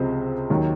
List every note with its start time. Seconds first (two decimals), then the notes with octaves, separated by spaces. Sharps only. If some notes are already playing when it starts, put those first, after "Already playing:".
Already playing: C#2 C3 F3 G#3 C4 C5
0.50 D#2 D#3 F#3